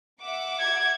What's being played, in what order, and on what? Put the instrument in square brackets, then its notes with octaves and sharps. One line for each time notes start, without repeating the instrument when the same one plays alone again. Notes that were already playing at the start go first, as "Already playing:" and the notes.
[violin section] E5 F#5 D6
[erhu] G#6